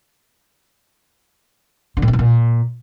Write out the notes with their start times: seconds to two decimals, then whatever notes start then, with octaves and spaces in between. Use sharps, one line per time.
1.97 D3
2.02 A2
2.08 C#3
2.13 B2
2.19 A#2